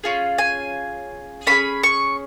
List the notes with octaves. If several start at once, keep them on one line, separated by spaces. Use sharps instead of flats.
C#4 F4 G#4
G#5
C#4 F4 G#4 B5
C#6